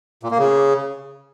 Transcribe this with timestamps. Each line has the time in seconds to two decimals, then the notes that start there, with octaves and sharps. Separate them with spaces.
0.23 A#2
0.31 A#3
0.38 C#3